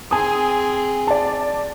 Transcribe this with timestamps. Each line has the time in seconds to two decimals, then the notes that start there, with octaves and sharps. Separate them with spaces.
0.11 C4 G#4 G#5 D#6
1.07 D5 A5